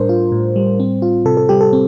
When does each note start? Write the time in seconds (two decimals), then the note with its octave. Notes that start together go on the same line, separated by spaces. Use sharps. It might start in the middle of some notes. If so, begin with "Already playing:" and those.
Already playing: A2 G3 D4 A#4 C5
0.09 F4
0.32 A2
0.56 G3
0.80 C4
1.02 F4
1.25 C3 A4
1.37 A4
1.49 G3 G4
1.61 A4
1.73 C4